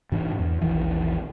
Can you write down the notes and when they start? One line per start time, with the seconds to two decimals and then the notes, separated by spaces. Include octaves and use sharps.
0.12 G#2 E3 D4
0.39 E2
0.61 E1 A#1 D#3 E3